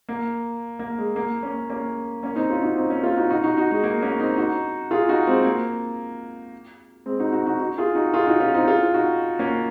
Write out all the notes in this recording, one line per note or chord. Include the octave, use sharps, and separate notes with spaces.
A#3
A#3
G#3
A#3
A#3 C#4
A#3 C#4
A#3 C#4
C4 D#4
C#4 F4
D#4 F#4
C4 D#4
A#3 C#4
C#4 F4
D#4 F#4
D#4 F#4
D#4 F#4
D#4 F#4
G#3
A#3
A#3 C#4
C4 D#4
D#4 F#4
F4 G#4
D#4 F#4
G#3 C4
A#3
G#3 C4
D#4 F#4
D#4 F#4
D#4 F#4
D#4 F#4
F4 G#4
D#4 F#4
F4 G#4
D#4 F#4
C#4 F4
C4 D#4
F4 G#4
D#4 F#4
A#3 C#4